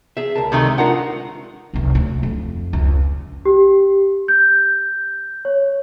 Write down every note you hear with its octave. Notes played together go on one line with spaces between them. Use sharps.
G#4 E5
C#2 A#4 A5
C3 D#3 A3
G#3
D4 F4 A#4 F#5
F1 C2
D2
F2
C#2
G4
G6
C#5